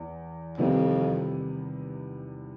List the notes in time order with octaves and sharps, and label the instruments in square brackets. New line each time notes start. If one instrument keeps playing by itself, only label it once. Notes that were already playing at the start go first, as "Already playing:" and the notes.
Already playing: [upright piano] E2
[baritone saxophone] F2 [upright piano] C3 D#3 G3 B3 E4